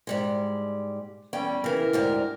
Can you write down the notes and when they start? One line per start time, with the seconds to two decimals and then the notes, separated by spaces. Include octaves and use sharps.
0.07 G#2 G3 G#3
1.33 E2 G3 C#4 G5
1.64 C#3 E3 A#4
1.93 D2 G#2 G3